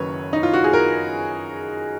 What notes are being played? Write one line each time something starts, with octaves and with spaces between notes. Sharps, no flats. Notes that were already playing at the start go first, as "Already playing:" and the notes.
Already playing: F#1 F#2 D#3 F#3 B4 C#5
D#4
F4
F#4
G#4
A#4